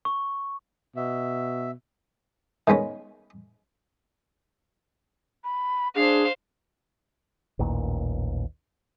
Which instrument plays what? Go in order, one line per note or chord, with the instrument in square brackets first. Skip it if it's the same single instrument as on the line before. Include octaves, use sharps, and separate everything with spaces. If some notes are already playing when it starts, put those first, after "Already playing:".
[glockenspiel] C#6
[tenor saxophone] B2 [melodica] E5
[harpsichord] D#3 G#3 B3 C#4
[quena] B5
[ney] D4 [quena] G#4 [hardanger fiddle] C5 F5
[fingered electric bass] A1 D#2 A#2